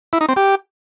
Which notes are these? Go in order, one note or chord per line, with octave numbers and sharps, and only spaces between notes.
E4
D#4
C4
G4